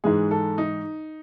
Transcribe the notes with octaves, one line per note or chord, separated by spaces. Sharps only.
G#2 E3 G#3 G#4
A4
D#4